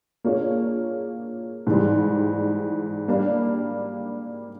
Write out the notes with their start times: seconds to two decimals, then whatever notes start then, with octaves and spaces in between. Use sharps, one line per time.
0.24 A#3 D4 F4 G#4 C#5
1.67 G#2 E3 G3
3.08 G3 A#3 D4